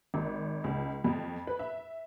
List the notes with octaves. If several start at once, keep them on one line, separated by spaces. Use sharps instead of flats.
G#1
C#2
F2
B4
E5